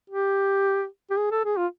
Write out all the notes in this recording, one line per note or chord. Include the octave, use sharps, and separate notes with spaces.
G4
G4
G#4
A4
G#4
F4